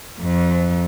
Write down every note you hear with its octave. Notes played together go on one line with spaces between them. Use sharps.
F2